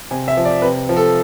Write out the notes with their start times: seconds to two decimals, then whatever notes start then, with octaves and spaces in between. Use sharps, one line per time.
0.11 C3 G#5
0.28 E5
0.37 F3
0.45 D5
0.62 C3 B4
0.89 F3
0.97 A4